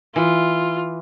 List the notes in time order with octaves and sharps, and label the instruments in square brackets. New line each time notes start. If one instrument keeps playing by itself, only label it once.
[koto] E3 [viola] F4